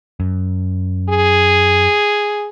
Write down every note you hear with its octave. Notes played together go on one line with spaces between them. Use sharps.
F#2
G#4